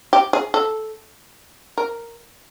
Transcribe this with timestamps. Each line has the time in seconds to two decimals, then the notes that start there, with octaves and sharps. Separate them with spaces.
0.13 G4
0.33 G#4
0.54 A4
1.78 A#4